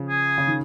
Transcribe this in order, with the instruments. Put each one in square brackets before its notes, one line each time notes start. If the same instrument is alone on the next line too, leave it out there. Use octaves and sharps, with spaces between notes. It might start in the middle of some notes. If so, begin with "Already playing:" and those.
Already playing: [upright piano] C#3 F3
[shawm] G#4
[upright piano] C#3
D#3